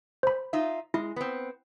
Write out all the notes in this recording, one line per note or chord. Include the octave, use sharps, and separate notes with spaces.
C5 B5
D#4 F4 E5
G#3 E4
B3 C4